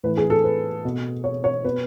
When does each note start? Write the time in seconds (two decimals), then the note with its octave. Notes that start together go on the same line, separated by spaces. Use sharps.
0.03 A2 E3 B4
0.17 G#4
0.30 A4
0.44 B4
0.85 B2
1.24 C#5
1.44 C#5
1.64 B2 B4